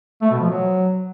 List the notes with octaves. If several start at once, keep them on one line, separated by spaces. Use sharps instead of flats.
A3
B2
F3
F#3